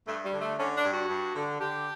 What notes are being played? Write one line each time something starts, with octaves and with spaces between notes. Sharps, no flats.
G2 A3
G3
D3
A3
D3 C#4
D4
G2
F#4
G2
D3
D3 G4